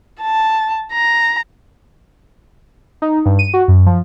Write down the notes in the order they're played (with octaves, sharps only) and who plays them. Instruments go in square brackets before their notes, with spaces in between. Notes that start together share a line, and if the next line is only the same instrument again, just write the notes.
[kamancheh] A5
A#5
[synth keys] D#4
G2
D#7
F#4
F#2
F3